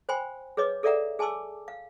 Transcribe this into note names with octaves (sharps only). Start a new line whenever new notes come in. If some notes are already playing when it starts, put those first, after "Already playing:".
C5 G5 G#5 B5 C6
G#4 B4 C#5 D#5 D6
G#4 A4 D5 E5 F#5 A#5
G#4 G#5 A5 C6 D6 E6
F5